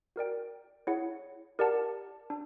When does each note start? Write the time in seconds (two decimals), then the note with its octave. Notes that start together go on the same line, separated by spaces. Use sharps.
0.16 F#4 A#4 D5 G5
0.87 E4 G#4 C#5 F#5
1.59 G4 A#4 D5 F#5 A5
2.30 D4